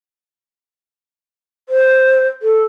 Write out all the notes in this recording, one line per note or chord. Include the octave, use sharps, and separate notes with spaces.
C5
A4